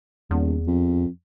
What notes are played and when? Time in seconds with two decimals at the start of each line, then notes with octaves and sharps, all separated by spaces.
0.31 D#1 E2
0.67 F2